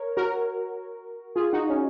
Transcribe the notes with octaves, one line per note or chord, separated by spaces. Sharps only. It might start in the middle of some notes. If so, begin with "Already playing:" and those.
Already playing: A#4 C#5
F#4 A#4
F4 G#4
D#4 F#4
C#4